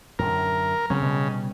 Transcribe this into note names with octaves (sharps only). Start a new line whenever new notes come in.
F#2 A2 D3 A#4
C#3 F#3 A3 C4
B2 G3